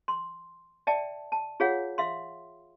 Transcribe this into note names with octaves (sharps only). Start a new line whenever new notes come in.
C6
D5 E5 G5 A5
A5
F4 G#4 C#5 F5 F#5
E5 F5 C6